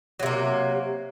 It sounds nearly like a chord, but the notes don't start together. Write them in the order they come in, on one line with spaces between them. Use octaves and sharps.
F#3 C3 A#3